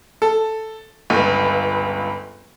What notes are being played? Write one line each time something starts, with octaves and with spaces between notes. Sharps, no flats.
A4
G1 C#2